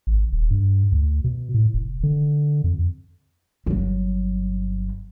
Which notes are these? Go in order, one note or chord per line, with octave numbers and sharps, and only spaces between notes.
G#1
D#1
G2
D2
B2
A2
F1
D3
F2
G1 F#3